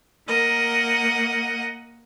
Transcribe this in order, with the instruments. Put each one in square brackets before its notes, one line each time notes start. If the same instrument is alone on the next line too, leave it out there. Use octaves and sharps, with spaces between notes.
[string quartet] A#3 A#4 D#5 F#5